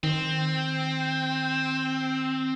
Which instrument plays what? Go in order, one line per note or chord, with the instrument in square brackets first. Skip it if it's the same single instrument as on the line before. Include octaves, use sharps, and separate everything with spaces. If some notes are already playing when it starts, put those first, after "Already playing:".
[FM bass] D#3 [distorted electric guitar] C4